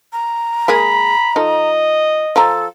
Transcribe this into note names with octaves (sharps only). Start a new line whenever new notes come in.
A#5
G#3 A#3 G#4 B5
F3 D#4 A4 D#5
F3 A4 A#5